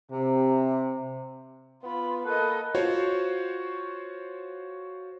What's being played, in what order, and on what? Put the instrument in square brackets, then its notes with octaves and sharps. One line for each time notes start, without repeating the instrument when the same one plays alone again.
[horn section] C3
[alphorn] B3 [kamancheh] F4 B5
[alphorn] A#3 [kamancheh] A4 D#5 [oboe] B4
[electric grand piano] F4 F#4 C5 C#5